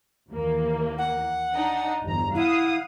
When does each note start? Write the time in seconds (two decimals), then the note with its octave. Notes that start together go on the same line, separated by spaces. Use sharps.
0.30 D#2 E3 A#3
0.98 F#5
1.55 D4 D#4
2.04 G1 E2 A#5
2.35 E4 F5 F#5 D#6